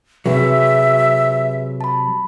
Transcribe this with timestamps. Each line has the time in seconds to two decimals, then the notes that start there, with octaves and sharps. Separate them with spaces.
0.26 C3 F#3 G#4 B4 E5
1.81 A5 B5